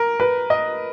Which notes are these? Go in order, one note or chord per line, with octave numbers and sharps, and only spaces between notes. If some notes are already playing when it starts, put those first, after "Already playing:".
Already playing: A#4
B4
D#5